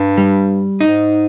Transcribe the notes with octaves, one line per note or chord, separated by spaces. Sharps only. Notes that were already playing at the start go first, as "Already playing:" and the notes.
Already playing: G2
G3
G#2 D#4